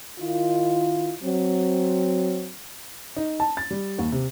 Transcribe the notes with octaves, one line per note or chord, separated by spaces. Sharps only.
D#3 E4 F4
F#3 C4
D#4
A5
A6
G3
D#2
C3